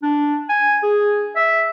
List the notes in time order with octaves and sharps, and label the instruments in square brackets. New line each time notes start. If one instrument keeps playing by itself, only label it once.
[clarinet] D4
G#5
G#4
E5